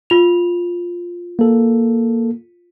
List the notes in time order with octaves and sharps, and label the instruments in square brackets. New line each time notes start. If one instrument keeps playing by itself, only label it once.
[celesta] F4 F7
[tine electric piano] A#3 A4